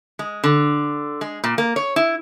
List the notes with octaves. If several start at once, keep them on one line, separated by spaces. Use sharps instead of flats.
G#3
D3
G#3
A#2
A#3
C#5
E4